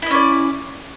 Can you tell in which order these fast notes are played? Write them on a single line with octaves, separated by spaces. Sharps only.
E4 D#5 C#4 D5